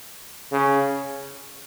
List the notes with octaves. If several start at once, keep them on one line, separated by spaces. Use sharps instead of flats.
C#3